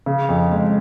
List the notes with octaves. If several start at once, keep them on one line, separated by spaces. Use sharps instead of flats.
C#3
F2
G#3